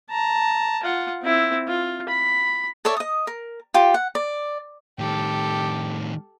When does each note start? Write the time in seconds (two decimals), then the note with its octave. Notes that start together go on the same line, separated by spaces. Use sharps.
0.11 A5 A#5
0.84 F4 F#5
1.23 C4 E4
1.67 F4
2.09 B5
2.85 A4 C#5 D5 E5
2.97 D#5 D#6
3.27 A#4
3.74 F4 G4 G5
3.94 F#5
4.15 D5
4.99 A2 D#3 G4 A4